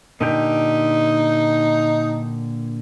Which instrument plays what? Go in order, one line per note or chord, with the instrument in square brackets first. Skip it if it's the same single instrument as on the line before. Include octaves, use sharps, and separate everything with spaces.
[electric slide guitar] A#2 D3 G4 [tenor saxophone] D#4